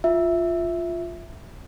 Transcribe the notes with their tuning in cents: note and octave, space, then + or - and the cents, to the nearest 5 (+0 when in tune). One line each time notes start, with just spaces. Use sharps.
F4 +0 E5 +0